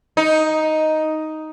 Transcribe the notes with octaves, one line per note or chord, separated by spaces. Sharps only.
D#4